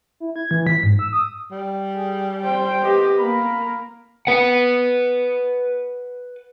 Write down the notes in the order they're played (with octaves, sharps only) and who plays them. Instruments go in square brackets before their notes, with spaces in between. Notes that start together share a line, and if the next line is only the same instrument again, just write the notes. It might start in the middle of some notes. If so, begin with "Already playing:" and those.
[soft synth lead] E4
G#6
E3
B6
G#2
E6
D#6
[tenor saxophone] G3
[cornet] G#4
[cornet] C5 [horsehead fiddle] G5
[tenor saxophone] B3 [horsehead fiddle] G4 D#5
[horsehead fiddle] A#3 A#4 [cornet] B5
[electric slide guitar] B4 F#5